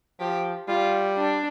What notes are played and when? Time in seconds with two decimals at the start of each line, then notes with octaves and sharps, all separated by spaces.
0.20 F3 G4
0.68 G3 F4
1.17 D4